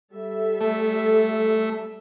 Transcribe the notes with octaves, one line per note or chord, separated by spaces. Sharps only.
G3 A4 E5
A3